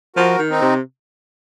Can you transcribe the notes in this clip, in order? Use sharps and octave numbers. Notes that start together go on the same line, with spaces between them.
F3 F#4 A#4
D#3
C4 D#4
C3